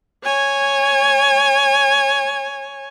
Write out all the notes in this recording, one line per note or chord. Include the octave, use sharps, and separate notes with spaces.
C#5 G#5